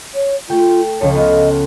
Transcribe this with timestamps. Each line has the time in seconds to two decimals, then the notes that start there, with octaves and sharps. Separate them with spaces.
0.15 C#5
0.49 A3 F4 G5
1.01 C#2 F3 A4 C#5
1.15 B3 F4 D#5